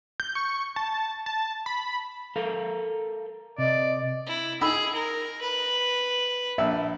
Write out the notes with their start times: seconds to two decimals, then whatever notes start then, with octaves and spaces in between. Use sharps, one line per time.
0.20 G6
0.35 C#6
0.76 A5
1.26 A5
1.66 B5
2.36 A4 A#4 F5
3.58 C3 D5 D#5
4.26 E4
4.61 D#4 G#4 B5 E6
4.94 A#4
5.41 B4
6.58 A#1 E5 E6